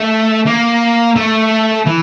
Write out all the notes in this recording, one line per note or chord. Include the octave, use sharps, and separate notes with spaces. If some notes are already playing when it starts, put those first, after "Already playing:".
Already playing: A3
A#3
A3
E3